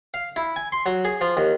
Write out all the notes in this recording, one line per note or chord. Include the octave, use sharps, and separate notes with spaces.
F5
E4
G#5
C6
F#3
G#4
F3
D#2